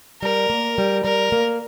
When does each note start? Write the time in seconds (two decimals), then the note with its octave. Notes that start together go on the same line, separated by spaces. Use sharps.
0.22 G3 A#4
0.50 A#3
0.78 G3
1.04 G3 A#4
1.32 A#3